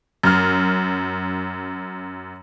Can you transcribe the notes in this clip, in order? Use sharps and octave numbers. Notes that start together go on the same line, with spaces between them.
F#2 F6